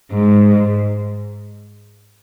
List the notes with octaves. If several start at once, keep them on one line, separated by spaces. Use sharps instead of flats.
G#2